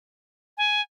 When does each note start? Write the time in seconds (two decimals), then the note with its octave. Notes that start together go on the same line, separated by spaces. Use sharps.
0.58 G#5